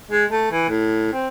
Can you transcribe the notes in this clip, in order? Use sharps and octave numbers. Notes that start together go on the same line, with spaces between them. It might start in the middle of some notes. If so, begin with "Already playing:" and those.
G#3
A3
E3
A2
C4